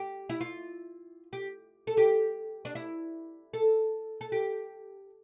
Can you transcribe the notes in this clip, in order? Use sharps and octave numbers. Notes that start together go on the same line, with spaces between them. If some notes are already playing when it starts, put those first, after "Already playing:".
Already playing: G4
E4
F4
G4
A4
G4
D4
E4
A4
A4
G4